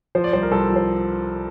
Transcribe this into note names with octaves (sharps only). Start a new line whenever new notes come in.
F3 C5
D5
C2 C5
A#4
C2 A4
F3
C5